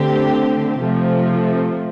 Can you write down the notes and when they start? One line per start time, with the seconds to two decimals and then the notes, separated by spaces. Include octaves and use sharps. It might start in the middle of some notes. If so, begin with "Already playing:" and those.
Already playing: D3 A3 C4 G4
0.79 C3 F3 A3